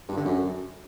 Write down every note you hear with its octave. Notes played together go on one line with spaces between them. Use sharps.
G2
D3
F#2